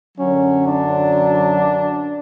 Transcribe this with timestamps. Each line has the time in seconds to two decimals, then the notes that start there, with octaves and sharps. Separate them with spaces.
0.17 F#2 D3 F#3 C#4
0.66 D4